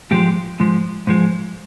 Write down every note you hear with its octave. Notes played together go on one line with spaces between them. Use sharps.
G#2 F3 G#3 G4
G#2 F3 G#3
G#2 F3 G#3